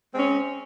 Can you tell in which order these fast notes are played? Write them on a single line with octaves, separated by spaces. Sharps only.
G#3 C4 C#4